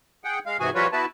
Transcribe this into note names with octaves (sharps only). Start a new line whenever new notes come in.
G#4 F#5 G5
G#3 F5
G#2 C3 E3 F#4 G#4 G#5
F3 G3 F4 F#4 B4 C#5
B3 E4 F#4 B4 A5